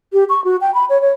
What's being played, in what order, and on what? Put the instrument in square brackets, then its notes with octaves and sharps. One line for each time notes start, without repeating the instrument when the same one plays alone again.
[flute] G4
C#6
F#4
G5
B5
C#5
C#5